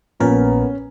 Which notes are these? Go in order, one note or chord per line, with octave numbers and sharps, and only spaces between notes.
A#1 A#2 B3 C#4 A#4